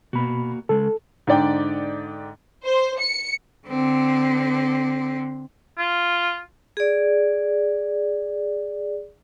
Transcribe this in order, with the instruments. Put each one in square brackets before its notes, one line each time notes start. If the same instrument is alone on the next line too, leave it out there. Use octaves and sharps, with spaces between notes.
[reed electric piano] B2 B5 [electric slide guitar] A#3 F#4
[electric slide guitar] C#3 G#3 [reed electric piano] A4
[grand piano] G#2 D3 D5 G5
[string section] C5
C#7
[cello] D3 C4
[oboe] F4
[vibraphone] G#4 D5